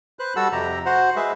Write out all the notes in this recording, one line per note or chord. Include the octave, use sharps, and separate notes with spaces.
B4 C5 F#6
G3 F#4 A4 F#5 A5 E6
F2 C3 G4 A#5
F#4 C5 F#5
G#3 G#4 B4 E5